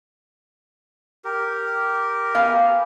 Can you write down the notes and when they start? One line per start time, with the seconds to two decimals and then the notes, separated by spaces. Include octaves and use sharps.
1.24 G4 A#4
2.34 B3 F5 G#5